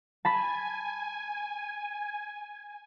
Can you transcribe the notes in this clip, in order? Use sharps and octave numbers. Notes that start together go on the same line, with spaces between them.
G#5 A5 B5 B6